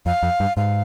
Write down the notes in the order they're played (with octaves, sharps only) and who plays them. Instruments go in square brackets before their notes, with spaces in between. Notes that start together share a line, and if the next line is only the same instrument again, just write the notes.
[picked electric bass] F2 [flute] F5
[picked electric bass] F2
G2
[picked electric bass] G#2 [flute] F5